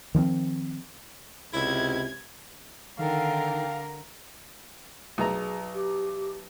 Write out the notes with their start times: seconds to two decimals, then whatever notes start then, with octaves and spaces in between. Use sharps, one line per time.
0.15 D#3 F3 G3 C4
1.53 C#2 C3 E4 G#6
2.99 D3 D#3 A4 A#4 F5 G5
5.18 B1 G#4 A#5
5.74 G4